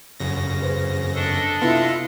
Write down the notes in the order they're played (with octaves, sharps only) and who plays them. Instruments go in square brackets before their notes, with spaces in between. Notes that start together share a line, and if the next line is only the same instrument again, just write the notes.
[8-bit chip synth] F#2 C#3 A#6
[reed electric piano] G#4 B4 C5
[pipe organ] D4 A4 D#5
[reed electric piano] C3 B3 [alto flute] E4 [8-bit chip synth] F4